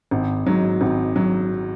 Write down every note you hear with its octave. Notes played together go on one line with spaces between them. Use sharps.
G#1
G#2 F#3
G#1
F#3